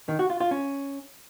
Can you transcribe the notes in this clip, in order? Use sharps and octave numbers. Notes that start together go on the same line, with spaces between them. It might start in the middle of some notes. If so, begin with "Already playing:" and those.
D#3
F#4
F4
F4
C#4